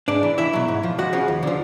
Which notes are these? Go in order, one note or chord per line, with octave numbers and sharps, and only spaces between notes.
G#2 D4 D5
E3
C#2 E4 E5
B2 F#3
G#2
F3
C#2 F#4 F#5
C#3 F3
D#2
D3 F3